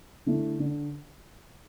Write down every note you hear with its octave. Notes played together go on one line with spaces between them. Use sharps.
D3 A3 E4
D3